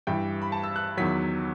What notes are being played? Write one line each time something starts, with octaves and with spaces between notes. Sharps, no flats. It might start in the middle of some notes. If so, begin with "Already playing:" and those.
G2 E3 G5
B5
A5
E6
F#6
E2 D#3 F#3 B6